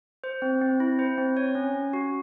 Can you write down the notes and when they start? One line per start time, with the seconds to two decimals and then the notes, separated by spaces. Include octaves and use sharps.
0.24 C5
0.42 C4
0.61 C4
0.80 E4
0.99 C5
1.18 C4
1.37 C#5
1.55 C#4
1.74 C#4
1.93 F#4